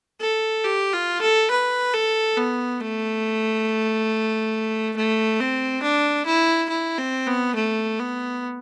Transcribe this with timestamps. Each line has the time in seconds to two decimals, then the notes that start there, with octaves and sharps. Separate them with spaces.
0.21 A4
0.64 G4
0.93 F4
1.22 A4
1.51 B4
1.94 A4
2.37 B3
2.81 A3
4.97 A3
5.40 C4
5.83 D4
6.26 E4
6.69 E4
6.98 C4
7.27 B3
7.56 A3
8.00 B3